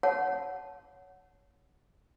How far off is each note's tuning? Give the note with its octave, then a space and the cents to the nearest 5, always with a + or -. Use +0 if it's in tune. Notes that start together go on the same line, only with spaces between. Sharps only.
C#5 +15 F#5 +0 A5 -15